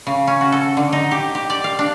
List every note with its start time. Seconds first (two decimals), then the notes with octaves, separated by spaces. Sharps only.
0.07 C#3
0.27 C#4
0.41 F#4
0.52 A4
0.77 D3
0.93 D#4
1.11 G4
1.35 G4
1.50 D5
1.64 F5
1.79 D4